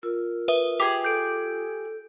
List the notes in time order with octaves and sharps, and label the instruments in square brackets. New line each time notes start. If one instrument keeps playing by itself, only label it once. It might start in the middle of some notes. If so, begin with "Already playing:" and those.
[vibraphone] F4 E6 [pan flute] A#4
[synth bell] B4 E5 D#6
[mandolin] G4 G#4
[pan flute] A4 [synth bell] G6 D7